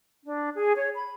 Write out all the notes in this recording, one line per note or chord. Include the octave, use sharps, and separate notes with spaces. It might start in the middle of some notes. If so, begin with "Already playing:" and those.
D4
G#4
C#5
B5